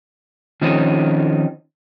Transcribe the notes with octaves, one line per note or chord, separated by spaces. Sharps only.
D#3 F3 C4 C#4 D#4